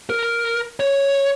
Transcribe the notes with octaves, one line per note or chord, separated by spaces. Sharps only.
A#4
C#5